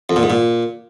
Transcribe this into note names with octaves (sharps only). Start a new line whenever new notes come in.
F2
A#2
G#2
A#2